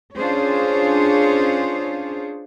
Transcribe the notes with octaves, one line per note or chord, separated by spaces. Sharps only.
C#4 D4 F4 G#4 C5 C#5